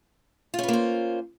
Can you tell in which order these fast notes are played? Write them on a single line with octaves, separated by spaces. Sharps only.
F4 C#4 B4 A#3 C5